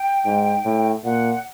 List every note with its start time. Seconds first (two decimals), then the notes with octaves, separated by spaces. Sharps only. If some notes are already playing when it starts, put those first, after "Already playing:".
Already playing: G5
0.26 G#2
0.65 A2
1.04 A#2 F#5